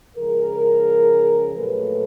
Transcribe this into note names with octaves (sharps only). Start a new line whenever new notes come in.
C#3 F3 G#3 G#4 A#4
A#2 F#3 A3 A4 B4